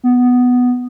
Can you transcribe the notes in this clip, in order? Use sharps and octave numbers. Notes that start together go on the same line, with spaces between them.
B3